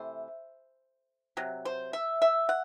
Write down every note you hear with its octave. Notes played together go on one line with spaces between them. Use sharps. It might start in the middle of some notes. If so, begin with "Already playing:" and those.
Already playing: C3 E3 A3 C5
C3 F#3
C5
E5
E5
F#5